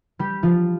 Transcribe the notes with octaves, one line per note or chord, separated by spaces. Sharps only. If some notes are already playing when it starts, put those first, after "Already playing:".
G3 G4
F3 F4